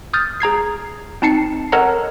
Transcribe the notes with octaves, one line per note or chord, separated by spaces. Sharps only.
D#6 F6 G6 A6
G#4 A#5 G#6 C7
C4 D#4 A5 C7 C#7
A4 A#4 C#5 D#5 F#5 A#5